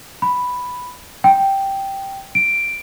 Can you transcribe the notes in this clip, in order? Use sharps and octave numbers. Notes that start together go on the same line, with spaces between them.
B5
G5
D7